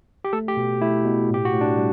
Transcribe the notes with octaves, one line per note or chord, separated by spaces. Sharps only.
G4
A3 A4
G4
B2
A3 E4
B2
A2 G4
F#4
A2
D4
G3